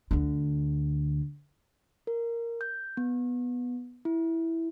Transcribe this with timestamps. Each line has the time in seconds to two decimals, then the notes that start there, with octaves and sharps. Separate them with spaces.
0.11 D2 D3
2.07 A#4
2.61 G6
2.97 B3
4.05 E4